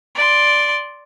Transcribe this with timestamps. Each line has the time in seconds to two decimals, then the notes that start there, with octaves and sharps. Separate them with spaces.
0.15 D5 C6